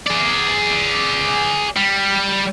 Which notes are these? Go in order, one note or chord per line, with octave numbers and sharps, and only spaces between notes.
G#4 D5
G3